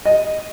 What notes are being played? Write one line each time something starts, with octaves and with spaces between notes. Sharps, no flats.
D#5